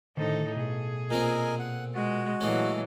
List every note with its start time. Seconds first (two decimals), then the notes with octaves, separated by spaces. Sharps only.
0.17 A2 D3 D#3 D#4 A4 C5
0.56 B2 G#4 A4
1.11 A#2 A#3 C4 A#4 D#5 G#5
1.59 F#5
1.95 G#3 F#4
2.41 A#2 E3 F#3 G#3 A3 C#4